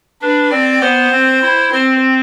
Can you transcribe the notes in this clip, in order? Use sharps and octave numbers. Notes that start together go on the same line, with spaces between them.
D4 B4
C4 D5
B3 C5
C4
E4
C4 C5